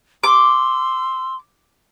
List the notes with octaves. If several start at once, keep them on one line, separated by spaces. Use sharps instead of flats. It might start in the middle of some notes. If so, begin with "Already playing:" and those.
C6 D6 E6